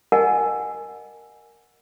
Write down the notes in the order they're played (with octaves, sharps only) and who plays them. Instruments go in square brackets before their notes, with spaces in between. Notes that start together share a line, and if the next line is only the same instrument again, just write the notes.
[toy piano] A#4 D#5 F#5 G#5 A5